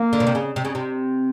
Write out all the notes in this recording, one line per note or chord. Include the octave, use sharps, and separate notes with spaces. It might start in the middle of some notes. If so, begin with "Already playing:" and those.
Already playing: A#3
D3
B2
C3
C#3
C3
C#3
C3